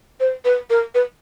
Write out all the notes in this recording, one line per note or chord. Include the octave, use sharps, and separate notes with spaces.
C5
B4
A#4
B4